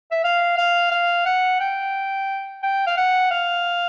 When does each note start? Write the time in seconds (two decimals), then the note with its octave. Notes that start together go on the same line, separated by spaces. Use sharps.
0.11 E5
0.24 F5
0.58 F5
0.91 F5
1.26 F#5
1.60 G5
2.63 G5
2.87 F5
2.97 F#5
3.31 F5